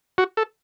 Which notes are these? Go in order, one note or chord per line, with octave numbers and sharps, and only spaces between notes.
F#4
A4